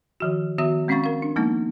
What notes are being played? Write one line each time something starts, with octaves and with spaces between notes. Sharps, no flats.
D#3 F3 F#4
D#3 B3 F#4 E5 D#6
G#3 C4 C#4 F5 C#6 A6
A#4 F5
D4
F3 G#3 A#3 B3 D#4